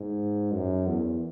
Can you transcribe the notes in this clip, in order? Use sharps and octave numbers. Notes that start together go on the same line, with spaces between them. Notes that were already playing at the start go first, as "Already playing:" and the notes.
Already playing: G#2
F#2
E2